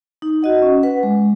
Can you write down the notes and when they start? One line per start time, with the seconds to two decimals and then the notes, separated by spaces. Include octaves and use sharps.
0.22 D#4
0.43 F#4 D#5 F#5
0.62 C#4
0.83 B4 F#5
1.03 G#3